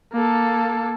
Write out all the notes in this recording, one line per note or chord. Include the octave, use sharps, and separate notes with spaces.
A#3 A4